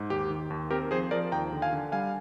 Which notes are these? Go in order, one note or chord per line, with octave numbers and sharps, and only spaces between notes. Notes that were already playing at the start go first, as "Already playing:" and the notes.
Already playing: G#2
D#2 G4
D#3
D#2
C4 G4 A#4
F3 G#4 C5
F3 A#4 D5
D#2 G5 A#5
D3
F5 G#5
D3
G3 F5 G#5